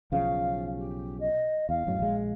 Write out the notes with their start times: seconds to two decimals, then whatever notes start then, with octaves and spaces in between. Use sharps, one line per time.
0.12 B1 C#3 F3 F5
0.78 G4
1.20 D#5
1.69 E2 F5
1.87 F#2 A2 F#3
1.99 A#1 G#3